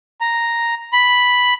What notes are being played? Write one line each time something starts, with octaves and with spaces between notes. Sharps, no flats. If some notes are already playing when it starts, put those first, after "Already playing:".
A#5
B5